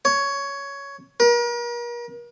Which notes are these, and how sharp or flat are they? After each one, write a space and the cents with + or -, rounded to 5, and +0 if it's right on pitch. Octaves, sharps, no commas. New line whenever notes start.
C#5 +10
A#4 +40